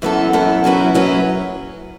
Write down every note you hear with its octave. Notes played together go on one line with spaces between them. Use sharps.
F#2 E3 B3 A4
F#2 E3 B3 A4
F#2 F#3 C#4 E4 B4
F#2 F#3 C#4 E4 B4